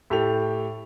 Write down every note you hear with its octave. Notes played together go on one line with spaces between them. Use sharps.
A2 G4 A4 F7